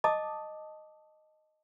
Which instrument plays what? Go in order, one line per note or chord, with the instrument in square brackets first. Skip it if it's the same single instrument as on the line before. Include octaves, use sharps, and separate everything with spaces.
[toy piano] D#5 A5 D6 D#6